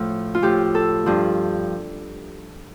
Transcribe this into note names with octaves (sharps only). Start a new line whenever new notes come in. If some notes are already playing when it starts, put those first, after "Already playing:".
Already playing: A2 F3
F4
A2 F3 G4
A4
G2 F3